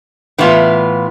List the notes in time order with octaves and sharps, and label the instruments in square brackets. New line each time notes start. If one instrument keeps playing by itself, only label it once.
[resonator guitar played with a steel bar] A2 E3 B3 F4